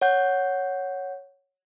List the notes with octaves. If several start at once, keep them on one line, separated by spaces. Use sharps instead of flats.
C#5 F#5 G6